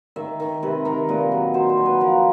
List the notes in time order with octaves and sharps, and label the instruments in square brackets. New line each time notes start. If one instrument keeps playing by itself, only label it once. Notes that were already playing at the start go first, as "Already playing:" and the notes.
[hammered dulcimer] D#3 E5
D#3
C3 B4
D#3 A#4
A#2 B4
F#3
F#3 C5
C5
F#3
B4
F3 A#4